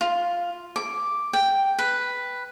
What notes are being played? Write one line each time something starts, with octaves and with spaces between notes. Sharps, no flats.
F4
D6
G5
B4